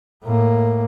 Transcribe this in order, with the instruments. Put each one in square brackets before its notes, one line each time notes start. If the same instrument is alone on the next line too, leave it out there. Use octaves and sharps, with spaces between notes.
[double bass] A2 A#3